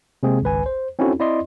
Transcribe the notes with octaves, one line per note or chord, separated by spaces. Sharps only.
C3 G#3 A#3 C4 G#4
G#1 C#2 B4 G#5
C5
C4 C#4 D#4 E4 F#4 A4
C4 E4 D5 D#5 C6